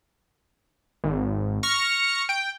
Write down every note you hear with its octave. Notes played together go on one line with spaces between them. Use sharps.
G#1
C#6 F6 A#6 C#7
G5